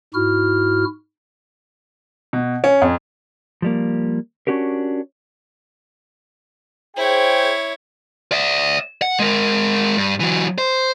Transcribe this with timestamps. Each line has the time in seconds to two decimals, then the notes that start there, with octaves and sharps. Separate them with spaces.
0.14 G#2 E4 F#4 F6
2.33 B2
2.64 C#4
2.82 F2
3.62 F3 G3 A#3
4.47 C#4 D4 F#4 G4 A#4
6.97 E4 G#4 C5 C#5 G5
8.32 D5 E5
9.02 F#5
9.20 G#3 A#4
9.97 G2
10.20 E3 F#3
10.58 C5